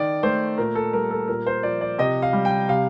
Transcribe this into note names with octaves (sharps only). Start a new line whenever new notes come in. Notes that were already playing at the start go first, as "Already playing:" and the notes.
Already playing: D#3 D5
A3 C5
A#2 A#4
A4
G3 A#4
A4
A#2 A#4
C5
F3 D5
D5
C3 D#5
F5
G3
G5
C3 F5